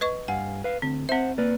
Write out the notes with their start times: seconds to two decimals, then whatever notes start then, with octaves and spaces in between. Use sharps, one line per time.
0.01 B4 D#5 C#6
0.28 G2 F5 F#5 G#5
0.64 B4 F5
0.82 D2 C4
1.09 C4 C5 E5 F#5
1.38 A#3 B4 D5